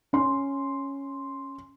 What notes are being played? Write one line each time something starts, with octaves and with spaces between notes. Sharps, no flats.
C#4 C6